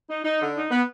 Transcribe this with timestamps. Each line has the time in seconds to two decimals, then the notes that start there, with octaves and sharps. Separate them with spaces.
0.08 D#4
0.24 D#4
0.40 D3
0.55 D#4
0.71 B3